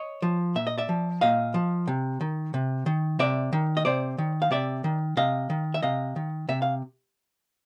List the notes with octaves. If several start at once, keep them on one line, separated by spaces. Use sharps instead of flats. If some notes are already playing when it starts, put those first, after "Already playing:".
Already playing: C#5 D#5
F3
A#2 E5
D#5
D5 E5
F3
A#2 D#5 F5
F3
C3
D#3
C3
D#3
C3 D5 E5
D#3
D#5
C3 C5 D5
D#3
F5
C3 D5 E5
D#3
C3 D#5 F5
D#3
E5
C3 D#5 F5
D#3
C3 E5
F5